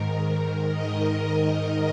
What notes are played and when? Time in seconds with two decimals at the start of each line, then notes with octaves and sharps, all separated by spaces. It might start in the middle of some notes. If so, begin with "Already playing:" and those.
Already playing: G#2 D#3 A#4
0.71 D#5